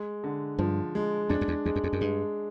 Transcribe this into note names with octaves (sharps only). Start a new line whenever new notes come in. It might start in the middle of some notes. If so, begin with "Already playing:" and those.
Already playing: G#3
D3
G2 F3
G#3
F2 D4
F2
E2
E2 G#3
F#2
F2
F#2
G2 G#3